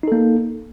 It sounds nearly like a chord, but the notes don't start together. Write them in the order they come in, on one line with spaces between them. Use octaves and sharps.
D#4 A4 A#3